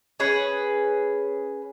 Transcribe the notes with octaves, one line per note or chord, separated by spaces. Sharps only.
C#4 G#4 B4